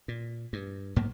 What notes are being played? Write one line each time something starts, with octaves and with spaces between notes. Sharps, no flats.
A#2
G2
B1 G#2 A#3 B3